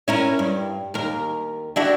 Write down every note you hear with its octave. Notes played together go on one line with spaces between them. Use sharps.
C#4 E4 A#4
G2
D#2 A#4
D4 E4 F#4